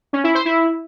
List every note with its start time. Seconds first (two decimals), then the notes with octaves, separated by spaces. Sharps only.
0.13 C#4
0.24 E4
0.35 C5
0.45 E4